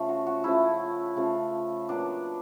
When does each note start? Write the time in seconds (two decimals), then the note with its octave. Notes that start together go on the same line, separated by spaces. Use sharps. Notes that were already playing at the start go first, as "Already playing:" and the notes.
Already playing: C#3 F3 A3
0.09 F#4
0.26 F#4
0.44 C#3 F3 A3 E4
1.16 C#3 F3 A3
1.89 A#2 F#3 B3 D4